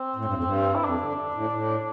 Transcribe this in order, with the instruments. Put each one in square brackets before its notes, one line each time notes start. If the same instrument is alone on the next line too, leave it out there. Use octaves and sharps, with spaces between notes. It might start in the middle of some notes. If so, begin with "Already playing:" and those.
Already playing: [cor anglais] C4
[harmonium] A2
G2
F2
G2
[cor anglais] E4
[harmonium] F2 [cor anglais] D4
[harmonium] D3
A2
A2